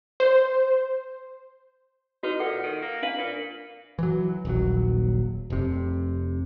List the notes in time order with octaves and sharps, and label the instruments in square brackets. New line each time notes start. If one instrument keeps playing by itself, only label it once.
[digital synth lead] C5
[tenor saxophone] D#4 [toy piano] F#4 B4
[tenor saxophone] A#2 [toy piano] A4 F#5
[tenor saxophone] D#3
A#3
[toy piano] D4 F5 [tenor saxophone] B4
[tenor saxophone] A#2
[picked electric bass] E3 F#3
D#1 A#1 F#3
F1 C3